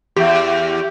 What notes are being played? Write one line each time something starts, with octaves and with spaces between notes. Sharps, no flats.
E2 G4